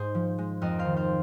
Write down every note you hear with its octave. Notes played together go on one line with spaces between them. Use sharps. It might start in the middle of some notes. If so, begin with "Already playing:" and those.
Already playing: G#2 G#4 C5
F3
G#3
F2 A#4 D#5
C5 F5
D#3
C5 F5